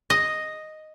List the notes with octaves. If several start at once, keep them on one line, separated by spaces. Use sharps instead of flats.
D#5